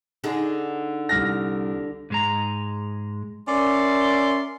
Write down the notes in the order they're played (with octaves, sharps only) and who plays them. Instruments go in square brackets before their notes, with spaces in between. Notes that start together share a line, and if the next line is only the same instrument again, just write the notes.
[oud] D3 D#4 G#4
[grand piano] C2 F6 A#6
[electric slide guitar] G#2 G#3 A#5
[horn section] C#4 A#4 D5 E5 C6